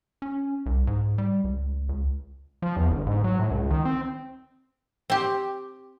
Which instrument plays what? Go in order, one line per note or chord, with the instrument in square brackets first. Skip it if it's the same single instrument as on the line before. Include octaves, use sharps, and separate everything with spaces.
[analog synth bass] C#4
C2
G#2
G3
C#2
C#2
F3
E2
G1
G#2
F#3
A2
C#2
D#3
C4
[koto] C4 G4